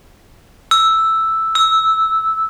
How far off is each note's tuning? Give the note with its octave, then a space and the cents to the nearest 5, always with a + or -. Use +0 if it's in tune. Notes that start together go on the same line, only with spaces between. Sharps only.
E6 +0
E6 -10